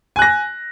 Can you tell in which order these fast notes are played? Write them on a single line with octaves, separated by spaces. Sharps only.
G#5 F#6 A#6